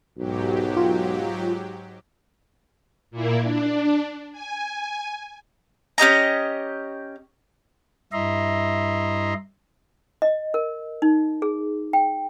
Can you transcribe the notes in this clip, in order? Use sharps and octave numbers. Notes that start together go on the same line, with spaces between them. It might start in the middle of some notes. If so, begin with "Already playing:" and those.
B1 G#2 F#3 G4
F4
A#2 A#3 E4
D4
G#5
C#4 G4 D#5 A#5
G2 E4 D#5 E5 A#5 C6
D#5
A#4
D#4
G#4
G5